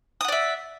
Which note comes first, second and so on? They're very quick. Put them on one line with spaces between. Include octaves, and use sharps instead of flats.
D#6 F#5 D5 E5